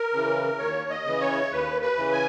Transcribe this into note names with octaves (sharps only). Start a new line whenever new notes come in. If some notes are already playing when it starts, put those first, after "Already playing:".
Already playing: A#4
C#3 E3
D#2 C#5
D#5
C#3 E3
C#5
D#2 B4
B4
C#3 E3
G#5